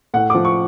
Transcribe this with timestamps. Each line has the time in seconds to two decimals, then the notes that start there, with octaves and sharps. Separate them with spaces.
0.14 A2 F#5
0.30 F3 D6
0.45 C#6